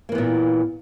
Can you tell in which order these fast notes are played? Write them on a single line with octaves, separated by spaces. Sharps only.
A#3 E3 B3 A#2